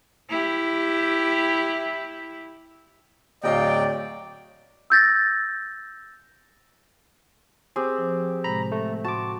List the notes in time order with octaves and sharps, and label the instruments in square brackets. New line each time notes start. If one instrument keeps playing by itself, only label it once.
[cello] E4 G4
[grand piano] D1 D#5 F5 [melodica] F#3 G5 [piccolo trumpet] D5
[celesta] E6 G6 A6 A#6
[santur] C4 G4 [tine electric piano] G#4
[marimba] F3
[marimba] A2 C3 G#3 [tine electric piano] A#5 B5
[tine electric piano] A3
[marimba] A2 C6 [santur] F#4 [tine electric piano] A5 D6